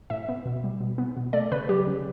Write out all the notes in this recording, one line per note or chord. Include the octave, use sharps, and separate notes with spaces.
A2 E5
B3
B2
G3
B2
B3
B2
A3 D5
C#3 B4
F#3 G4
C#3